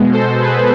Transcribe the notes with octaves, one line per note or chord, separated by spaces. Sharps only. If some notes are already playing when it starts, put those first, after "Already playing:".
Already playing: B2 G#3
A4 C5
G#4 B4